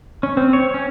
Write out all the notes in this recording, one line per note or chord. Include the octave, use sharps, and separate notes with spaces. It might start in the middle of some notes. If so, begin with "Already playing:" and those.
C#4
C4
C#5
C#4